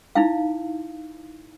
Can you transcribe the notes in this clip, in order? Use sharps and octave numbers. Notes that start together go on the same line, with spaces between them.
D#4 E4 F5